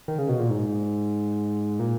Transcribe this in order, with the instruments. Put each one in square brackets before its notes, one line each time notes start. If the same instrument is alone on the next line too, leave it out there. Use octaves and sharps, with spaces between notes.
[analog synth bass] D#3
C#3
B2
A#2
G#2
A#2